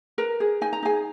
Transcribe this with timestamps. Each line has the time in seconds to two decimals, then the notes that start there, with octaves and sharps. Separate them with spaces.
0.18 A#4 B4 A#5
0.40 G#4
0.61 D#4 G#5
0.73 A#5
0.83 D#4 G#4 G#5